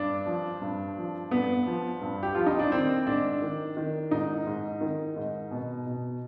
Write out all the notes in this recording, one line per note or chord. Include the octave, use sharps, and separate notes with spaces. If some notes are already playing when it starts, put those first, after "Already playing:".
Already playing: G2 D4
F3
G2
F3
G2 B3
F3
G2
G4
F3 F4
D#4
D4
D#3 C4
G#2 D4
D#3
D#3
G#2 D#4
G#2
D#3
G#2
B2
B2